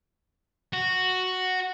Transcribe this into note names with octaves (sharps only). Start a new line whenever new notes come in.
F#4